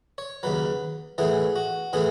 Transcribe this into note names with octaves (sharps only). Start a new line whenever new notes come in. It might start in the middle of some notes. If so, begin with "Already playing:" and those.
C#5
D#2 C#3 F#3 B4
A2 E3 B3 G#4
F#4
A2 E3 B3 G#4